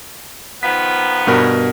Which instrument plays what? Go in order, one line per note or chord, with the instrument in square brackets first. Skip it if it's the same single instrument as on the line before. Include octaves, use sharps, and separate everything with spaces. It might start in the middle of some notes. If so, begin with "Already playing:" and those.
[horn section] D#3 F3 B3 [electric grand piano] B6
[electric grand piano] G2 B2 A#4